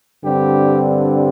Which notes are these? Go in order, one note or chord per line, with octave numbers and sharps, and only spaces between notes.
G2 D3 G3 C4 G4